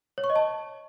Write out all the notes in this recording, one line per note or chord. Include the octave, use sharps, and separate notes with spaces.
C#5
C#6
D#5
A5